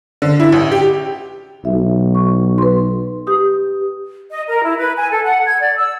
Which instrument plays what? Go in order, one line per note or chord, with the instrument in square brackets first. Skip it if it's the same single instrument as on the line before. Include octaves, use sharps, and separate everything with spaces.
[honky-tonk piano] D3
E4
A1
G4
[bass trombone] B1 [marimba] E5
[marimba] C#6
B4 C6
G4 D#6
[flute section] D#5
A#4
E4
B4
G#5
A4
F#5
G#6
D5
E6